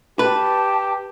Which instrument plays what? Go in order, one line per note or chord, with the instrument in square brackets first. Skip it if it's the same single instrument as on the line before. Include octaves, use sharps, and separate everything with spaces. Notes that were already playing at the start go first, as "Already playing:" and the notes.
[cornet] G4 [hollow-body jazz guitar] B4 [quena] A5